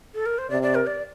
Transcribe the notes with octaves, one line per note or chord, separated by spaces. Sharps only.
A4
A#4
C5
C3 D5
D5
A#4
D5